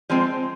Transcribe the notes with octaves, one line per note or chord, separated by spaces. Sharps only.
F3 G#3 C4